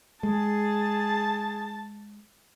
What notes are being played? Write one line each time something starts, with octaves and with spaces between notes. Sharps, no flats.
G#3 G#4 A5